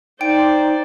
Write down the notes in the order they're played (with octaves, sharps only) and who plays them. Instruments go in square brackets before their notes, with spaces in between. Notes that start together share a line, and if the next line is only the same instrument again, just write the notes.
[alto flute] D#4 [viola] C5 D5 [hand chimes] G5 D7